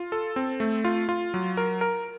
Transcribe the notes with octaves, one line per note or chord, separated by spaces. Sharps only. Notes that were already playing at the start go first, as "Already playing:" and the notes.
Already playing: F4
A4
C4
A3
F4
F4
F#3
A#4
A#4